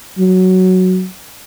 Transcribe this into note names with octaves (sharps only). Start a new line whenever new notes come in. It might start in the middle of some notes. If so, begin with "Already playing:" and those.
F#3